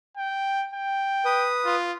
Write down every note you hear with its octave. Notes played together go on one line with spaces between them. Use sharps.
G5
G5
B4 D#6
F4